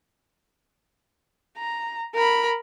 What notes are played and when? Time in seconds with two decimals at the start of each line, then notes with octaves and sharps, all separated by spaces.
1.58 A#5
2.15 A#4 B5